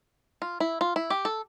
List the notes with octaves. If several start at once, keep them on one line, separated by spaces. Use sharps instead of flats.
F4
E4
F4
E4
G4
A4